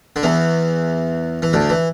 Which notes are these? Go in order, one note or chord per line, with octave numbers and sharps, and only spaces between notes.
D3
E2 E3
E3
D2 D3
E3